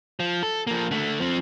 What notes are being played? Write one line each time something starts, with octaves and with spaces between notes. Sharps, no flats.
F3
A4
F3 A#3
D3 A3
F3 C4